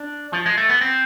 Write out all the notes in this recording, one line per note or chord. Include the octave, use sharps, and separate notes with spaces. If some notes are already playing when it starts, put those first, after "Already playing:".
Already playing: D4
F3
G#3
A3
B3
C4